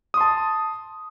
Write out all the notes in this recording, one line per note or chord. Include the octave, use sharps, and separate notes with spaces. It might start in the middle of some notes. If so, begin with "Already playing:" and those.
A5 C6 D#6